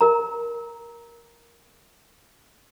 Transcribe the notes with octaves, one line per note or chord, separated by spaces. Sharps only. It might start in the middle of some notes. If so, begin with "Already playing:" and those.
A#4 A#5